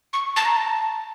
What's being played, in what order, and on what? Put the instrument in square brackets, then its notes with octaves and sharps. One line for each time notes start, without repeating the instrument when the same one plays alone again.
[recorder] C#6
A5
A#5
A5